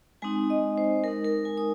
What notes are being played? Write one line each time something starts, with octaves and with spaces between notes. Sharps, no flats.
G#3 C4 D#4 G#5
D#5
C5
G#3 D#4 A#4
A#4
G#5
D#6